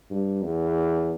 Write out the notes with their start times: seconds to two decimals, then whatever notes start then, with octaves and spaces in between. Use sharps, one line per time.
0.10 G2
0.43 E2